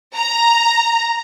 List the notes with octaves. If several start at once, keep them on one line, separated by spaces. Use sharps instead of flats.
A#5